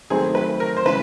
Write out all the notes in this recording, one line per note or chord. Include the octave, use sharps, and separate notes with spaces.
D#3 F#3 A3 C4 G#4
B4
A#4
C5
C#3 E3 G#3 B4